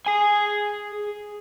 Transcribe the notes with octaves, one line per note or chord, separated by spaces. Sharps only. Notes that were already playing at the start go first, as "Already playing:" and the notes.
G#4 G#5